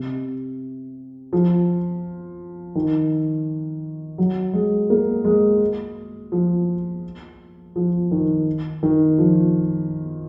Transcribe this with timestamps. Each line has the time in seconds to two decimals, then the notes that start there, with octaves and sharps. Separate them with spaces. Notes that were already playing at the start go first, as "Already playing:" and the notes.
Already playing: C3
1.33 F3
2.75 D#3
4.18 F#3
4.53 G#3
4.90 A#3
5.25 G#3
6.32 F3
7.76 F3
8.11 D#3
8.83 D#3
9.18 F3